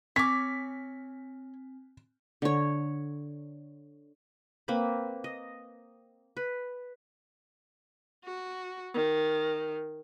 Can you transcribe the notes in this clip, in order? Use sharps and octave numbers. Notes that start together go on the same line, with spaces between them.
C4 C#5 G#5 D6 F6 B6
D3 C#5
A#3 C4 B4 B5
D#5
B4
F#4
D#3